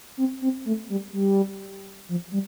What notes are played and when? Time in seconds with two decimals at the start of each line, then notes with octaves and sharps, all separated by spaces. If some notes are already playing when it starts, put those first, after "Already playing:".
0.17 C4
0.42 C4
0.65 A3
0.89 G3
1.13 G3
2.09 F3
2.32 G3